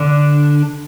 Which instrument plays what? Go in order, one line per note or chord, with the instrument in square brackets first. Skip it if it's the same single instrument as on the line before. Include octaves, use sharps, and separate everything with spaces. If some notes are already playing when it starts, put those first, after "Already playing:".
Already playing: [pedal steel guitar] D3 D4